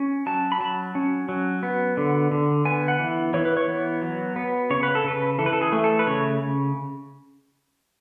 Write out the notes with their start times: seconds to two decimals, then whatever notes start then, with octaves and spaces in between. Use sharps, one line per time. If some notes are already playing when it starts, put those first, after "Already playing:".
Already playing: C#4
0.26 F#3 A5
0.52 B5
0.60 F#3 A5
0.95 C#4
1.29 F#3
1.63 B3
1.97 D3
2.31 D3
2.65 B3 G#5
2.88 F#5
3.00 E3
3.34 E3 C#5
3.45 B4
3.57 C#5
3.68 B3
4.02 F#3
4.36 B3
4.70 C#3 C#5
4.83 B4
4.95 A4
5.04 C#3 B4
5.39 E3 A4
5.46 B4
5.53 A4
5.61 G#4
5.72 A3
5.84 A4
5.99 B4
6.07 C#3 C#5